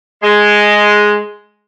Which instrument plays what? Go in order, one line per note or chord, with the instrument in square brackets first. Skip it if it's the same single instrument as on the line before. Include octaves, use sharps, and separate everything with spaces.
[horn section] G#3